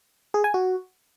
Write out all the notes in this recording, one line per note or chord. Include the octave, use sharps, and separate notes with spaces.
G#4
G#5
F#4